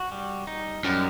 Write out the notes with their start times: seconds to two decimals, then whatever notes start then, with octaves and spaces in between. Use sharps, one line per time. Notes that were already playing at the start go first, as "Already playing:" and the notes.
Already playing: F#4
0.12 G3
0.47 D#4
0.85 F#2 G3